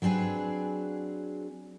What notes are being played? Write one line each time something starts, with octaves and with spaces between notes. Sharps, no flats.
F#3 C4 D4 G#4 B4